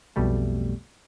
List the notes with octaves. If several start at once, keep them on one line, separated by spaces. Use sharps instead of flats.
B1 F2 B2 G3 A3